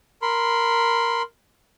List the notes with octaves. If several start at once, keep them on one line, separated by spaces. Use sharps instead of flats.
A#4 B5 C6